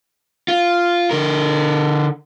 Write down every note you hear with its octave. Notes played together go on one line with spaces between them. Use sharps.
F4
D3 A#4